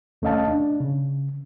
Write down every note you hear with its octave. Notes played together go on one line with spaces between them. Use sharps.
D#2 A3 C#4 D#5 F5 A5
D4
C#3